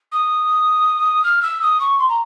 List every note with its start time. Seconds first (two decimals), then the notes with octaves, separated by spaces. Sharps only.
0.12 D#6
1.24 F6
1.43 E6
1.62 D#6
1.80 C#6
1.99 C6
2.09 A#5